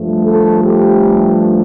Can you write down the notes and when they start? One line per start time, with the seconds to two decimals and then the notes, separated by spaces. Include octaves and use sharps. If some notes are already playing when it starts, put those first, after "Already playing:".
Already playing: G2 F3 A3
0.24 A4
0.63 G4